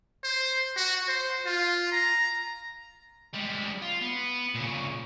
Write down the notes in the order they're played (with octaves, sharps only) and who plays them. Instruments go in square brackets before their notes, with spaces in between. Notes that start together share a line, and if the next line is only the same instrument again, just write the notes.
[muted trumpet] C5
F#4
C5
F4
A#5
[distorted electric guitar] G3 G#3
F4
B3
A#2 C#3